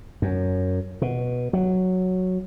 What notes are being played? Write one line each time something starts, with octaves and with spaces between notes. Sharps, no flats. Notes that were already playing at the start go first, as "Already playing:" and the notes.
F#2
B2
F#3